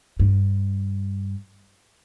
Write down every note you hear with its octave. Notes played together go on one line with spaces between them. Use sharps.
G2